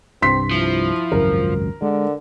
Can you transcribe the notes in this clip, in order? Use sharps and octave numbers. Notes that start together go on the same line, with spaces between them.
C2 G2 C4 C6 B6
F3 E4
G#1 C#2 F#2 A#4
D3 G#3